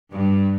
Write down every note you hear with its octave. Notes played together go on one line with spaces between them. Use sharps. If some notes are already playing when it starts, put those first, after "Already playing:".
G2